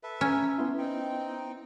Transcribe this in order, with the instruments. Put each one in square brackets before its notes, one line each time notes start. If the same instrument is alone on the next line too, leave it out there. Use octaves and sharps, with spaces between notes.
[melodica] A4 B4 E5
[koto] C#4 [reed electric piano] A#5
[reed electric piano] B3 E4 [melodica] C6
[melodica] C4 D#4 G5